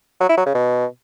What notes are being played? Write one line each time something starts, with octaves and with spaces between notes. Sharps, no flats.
F#3
E4
F#3
C#3
B2